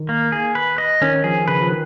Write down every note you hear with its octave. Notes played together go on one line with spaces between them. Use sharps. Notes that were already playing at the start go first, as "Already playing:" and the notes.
Already playing: D#3
A#3
G#4
B4
D#5
D#3 C#4
F3 G#4
C#3 B4
F3
D#3